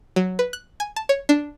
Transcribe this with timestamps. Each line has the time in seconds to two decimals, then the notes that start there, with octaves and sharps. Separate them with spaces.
0.16 F#3
0.39 B4
0.53 F#6
0.80 G#5
0.96 A5
1.09 C#5
1.29 D4